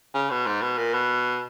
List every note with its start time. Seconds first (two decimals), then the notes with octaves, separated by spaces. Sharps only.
0.14 C#3
0.30 B2
0.46 G#2
0.62 B2
0.78 A#2
0.94 B2